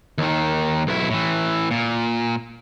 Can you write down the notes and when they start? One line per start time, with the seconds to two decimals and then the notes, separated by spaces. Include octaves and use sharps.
0.18 D#2 D#3
0.87 B1 E4
1.10 A2 E3
1.71 A#2